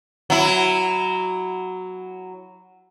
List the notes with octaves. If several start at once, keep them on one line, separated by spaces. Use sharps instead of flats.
F#3 E4